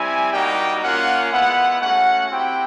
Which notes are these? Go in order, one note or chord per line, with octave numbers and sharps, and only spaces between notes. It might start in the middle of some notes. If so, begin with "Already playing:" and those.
Already playing: G3 C4 E4 G#5
G3 A#3 D#4 F#4 G5
A#3 C#4 F4 F#5
G#3 B3 E4 F#5
A3 C#4 F#4 F#5
C4 E4 G4 G5